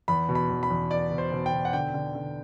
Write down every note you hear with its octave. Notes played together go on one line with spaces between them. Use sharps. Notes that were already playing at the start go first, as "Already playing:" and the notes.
E2 B5
B2
B5
E2
B5
E2
E2 D5
B2
C5
B2
G5
B2
F#5
D3 G5
D3
D3